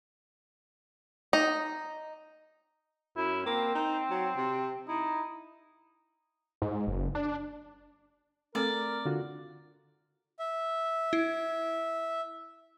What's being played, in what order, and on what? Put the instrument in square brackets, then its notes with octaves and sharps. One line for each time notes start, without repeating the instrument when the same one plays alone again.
[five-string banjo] D#4
[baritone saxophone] F#2 [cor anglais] E4
[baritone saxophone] A#3 [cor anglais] C4
[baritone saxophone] D#4
F#3
C3
[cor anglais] D#4 [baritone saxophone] E4
[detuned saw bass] G#2
F#1
D4
[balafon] A3 C4 A4 [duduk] A#4 [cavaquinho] D5
[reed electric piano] D3 F4 F#4
[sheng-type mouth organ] E5
[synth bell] E4